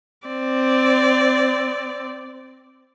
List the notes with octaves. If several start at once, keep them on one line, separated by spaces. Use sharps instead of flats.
C4 D5